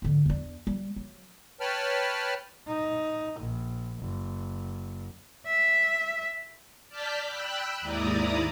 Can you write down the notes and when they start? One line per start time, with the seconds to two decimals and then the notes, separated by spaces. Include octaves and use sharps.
0.02 G#2 D3
0.26 E2 D4
0.67 G3
0.96 F#3
1.61 B4 C#5 G5 A5 B5 F6
2.68 D#4
3.40 A#1
3.99 F#1
5.46 E5
6.89 D5 A5 F6 G6 B6
7.26 G5 B5 E6 F#6
7.81 D#2 G#2 E4 D5 A#5 D#6